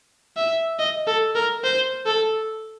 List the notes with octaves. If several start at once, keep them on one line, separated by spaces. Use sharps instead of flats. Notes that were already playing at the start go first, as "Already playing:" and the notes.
E5
D#5
A4
A#4
C5
A4